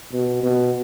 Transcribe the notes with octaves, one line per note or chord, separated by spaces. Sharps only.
B2
B2